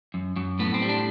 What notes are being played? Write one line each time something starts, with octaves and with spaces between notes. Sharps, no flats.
F#2
F#2
A2 B3
C4
G3
D4